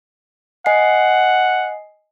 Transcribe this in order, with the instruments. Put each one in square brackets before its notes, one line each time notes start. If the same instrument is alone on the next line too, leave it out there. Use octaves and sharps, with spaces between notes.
[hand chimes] D#5 G#5 C7 [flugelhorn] F#5